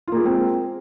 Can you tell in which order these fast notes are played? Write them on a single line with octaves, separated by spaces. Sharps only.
F4 A#3 G#4 G#3 C4